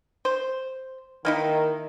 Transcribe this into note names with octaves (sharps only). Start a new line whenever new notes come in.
C5
D#3 A#3 D#4 E4